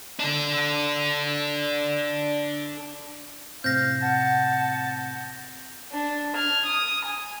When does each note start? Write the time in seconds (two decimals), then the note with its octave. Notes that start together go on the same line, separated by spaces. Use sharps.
0.20 D4 A4
3.64 A2 C3 C4 F5 G6 A#6
4.02 F#5 A5
5.92 D4
6.35 F6 G#6
6.66 D#6
7.05 G#5